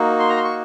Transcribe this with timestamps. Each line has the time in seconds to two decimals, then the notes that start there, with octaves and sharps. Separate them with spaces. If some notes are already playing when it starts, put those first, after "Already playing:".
Already playing: A#3 D#4 F#4
0.19 C6
0.29 A#5
0.37 C6
0.44 C#6